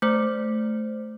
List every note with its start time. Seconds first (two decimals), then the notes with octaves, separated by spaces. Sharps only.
0.02 A3 C5